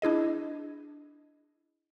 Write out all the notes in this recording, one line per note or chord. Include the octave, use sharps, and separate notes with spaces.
D4 E4 G#4 D#5